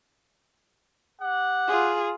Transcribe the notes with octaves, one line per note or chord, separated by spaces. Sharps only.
G4 F#5
F4 G#4